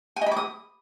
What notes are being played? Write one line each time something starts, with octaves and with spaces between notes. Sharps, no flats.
G#5
D#5
B5
D6
D#6